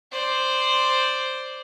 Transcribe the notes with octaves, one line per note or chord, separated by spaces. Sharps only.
C5 D5